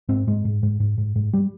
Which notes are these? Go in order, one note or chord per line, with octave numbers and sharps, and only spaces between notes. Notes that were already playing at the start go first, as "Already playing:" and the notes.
G#2 C4
G#2 G#3
G#2
G#2
G#2
G#2
G#2
G3